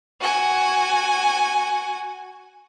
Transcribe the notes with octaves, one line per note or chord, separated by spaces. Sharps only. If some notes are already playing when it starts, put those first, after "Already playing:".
F#4 G#5